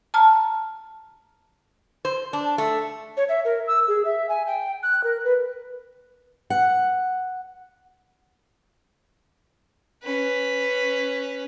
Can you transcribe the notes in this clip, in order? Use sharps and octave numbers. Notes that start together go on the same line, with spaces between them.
A5 A#5 F6
C5
D4
A3
C#5
E5
A#4
E6
G#4
E5
G#5
G5
F#6
A#4
B4
F#5
C#4 B4